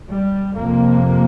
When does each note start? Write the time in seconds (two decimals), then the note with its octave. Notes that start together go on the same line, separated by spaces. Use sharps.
0.09 G3
0.55 F2 C3 A#3